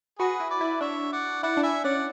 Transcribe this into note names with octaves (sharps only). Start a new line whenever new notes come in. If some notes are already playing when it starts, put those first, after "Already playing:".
F#4 G#4 B4
E4
B4 D5
E4
D4 C#5 E5
D5 F#5
E4 D5 F#5
D4
E4 E5 G#5
C#4 D5 F#5